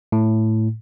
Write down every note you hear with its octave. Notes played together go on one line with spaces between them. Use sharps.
A2